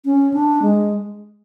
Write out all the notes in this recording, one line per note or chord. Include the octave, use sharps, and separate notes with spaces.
C#4
D4
G#3